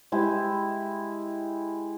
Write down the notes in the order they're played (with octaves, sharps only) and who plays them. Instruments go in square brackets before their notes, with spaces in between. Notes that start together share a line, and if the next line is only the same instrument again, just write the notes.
[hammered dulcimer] G#3 E4 G4